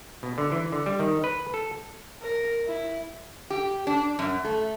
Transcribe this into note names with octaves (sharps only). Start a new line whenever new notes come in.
B2
D3
E3
D3
G3
D#3
B4
A4
A#4
E4
G4
D4
F#2
A3